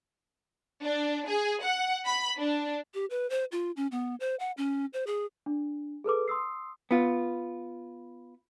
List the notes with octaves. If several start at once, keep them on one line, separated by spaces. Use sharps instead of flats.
D4
G#4
F#5
B5
D4
G4
B4
C5
F4
C#4
B3
C5
F#5
C#4
C5
G#4
D4
G#4 A4 B4 D6
C6 D#6 E6 C7
B3 F4